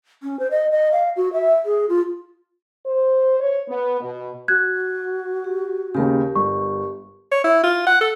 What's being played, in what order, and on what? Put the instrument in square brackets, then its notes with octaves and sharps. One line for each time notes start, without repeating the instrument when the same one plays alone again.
[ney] C#4
C5
D#5
D#5
F5
F#4
E5
G#4
F4
[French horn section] C5
C#5
B3
B2
[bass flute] F#4 [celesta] F#6 G#6
[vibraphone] G4
[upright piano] D#2 C#3 [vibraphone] G4 A#4
[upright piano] G1 [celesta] C#6
[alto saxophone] C#5
E4
F4
F#5
A4